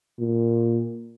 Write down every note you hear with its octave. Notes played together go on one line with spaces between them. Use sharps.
A#2